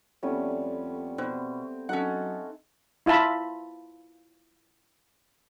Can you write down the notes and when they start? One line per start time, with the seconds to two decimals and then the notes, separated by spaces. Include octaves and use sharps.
0.23 F2 G3 A3 B3 C#4
1.18 B2 C4
1.89 F#3 C#4 D#4 A4 F#5
3.06 E4 F4 E5 A5 B5